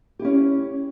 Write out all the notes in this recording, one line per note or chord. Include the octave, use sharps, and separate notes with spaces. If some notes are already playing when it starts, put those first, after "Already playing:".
C#4 E4 G4